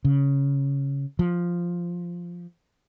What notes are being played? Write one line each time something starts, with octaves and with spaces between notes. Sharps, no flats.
C#3
F3